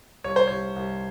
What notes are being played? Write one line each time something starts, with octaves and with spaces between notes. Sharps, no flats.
C2 C#5
C5
C2 C#5
C2